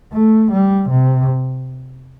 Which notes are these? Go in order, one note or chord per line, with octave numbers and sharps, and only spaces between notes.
A3
G3
C3